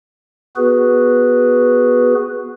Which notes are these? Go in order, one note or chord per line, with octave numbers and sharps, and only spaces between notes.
B3 F#4 G#4 B4